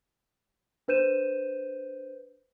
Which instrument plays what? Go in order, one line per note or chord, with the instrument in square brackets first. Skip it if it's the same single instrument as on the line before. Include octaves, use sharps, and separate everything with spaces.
[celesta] D4 B4 C5 G6 D#7 E7